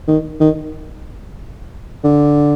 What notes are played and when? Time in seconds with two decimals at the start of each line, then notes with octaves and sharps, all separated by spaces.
0.08 D#3
0.40 D#3
2.04 D3